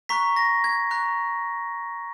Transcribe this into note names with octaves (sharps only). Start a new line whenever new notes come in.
A#5 C#6 F#6 B6
A#6
G#6
A#5 C#6 F#6